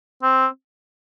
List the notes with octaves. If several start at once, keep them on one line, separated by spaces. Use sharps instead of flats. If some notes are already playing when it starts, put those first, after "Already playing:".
C4